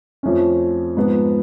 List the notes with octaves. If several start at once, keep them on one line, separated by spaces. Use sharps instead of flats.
F2 F3 A3 C#4
G#2 F3 B3